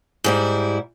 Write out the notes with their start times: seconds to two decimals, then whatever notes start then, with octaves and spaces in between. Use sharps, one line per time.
0.24 G#2 G3 E4